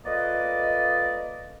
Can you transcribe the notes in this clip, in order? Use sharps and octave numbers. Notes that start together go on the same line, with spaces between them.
A#3 F4 A4 B4 D5 D#5